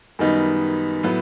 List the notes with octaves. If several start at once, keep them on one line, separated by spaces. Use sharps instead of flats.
F#2 D#3 G3 B3 D#4
A2 F#3 B3